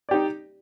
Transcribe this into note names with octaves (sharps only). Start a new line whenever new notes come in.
D#4 G4 D5